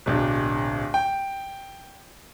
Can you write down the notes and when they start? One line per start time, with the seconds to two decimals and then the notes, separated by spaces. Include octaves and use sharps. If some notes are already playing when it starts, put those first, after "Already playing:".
0.06 D1 B1 D4
0.94 G5